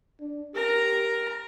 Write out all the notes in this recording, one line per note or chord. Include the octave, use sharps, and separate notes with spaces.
D4
G4 A#4 A#5